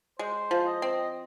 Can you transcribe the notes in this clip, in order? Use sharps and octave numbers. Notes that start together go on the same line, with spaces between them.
G#3 C5
F3
D#5
C4